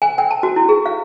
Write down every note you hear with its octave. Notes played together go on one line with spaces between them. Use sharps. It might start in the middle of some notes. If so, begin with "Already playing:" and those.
G#5
G5
A5
F#4
E4
G#4
F5